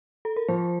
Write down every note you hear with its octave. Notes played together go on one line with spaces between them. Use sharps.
A4
A#4
F3 C5